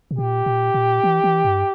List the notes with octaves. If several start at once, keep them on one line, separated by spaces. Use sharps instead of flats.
B2
A#2 G4
A#2
A#2
E3
E3
G2